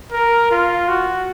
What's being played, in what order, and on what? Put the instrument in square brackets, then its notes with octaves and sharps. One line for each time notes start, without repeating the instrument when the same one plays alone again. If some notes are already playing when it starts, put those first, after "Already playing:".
[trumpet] A#4
F4
F#4